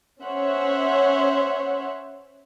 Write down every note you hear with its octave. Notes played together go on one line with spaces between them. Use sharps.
C#4 C5 C#5 E5 F#5